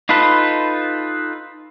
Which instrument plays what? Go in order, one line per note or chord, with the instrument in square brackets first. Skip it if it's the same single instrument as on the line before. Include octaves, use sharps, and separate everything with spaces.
[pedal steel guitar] D#4 F4 A4 B4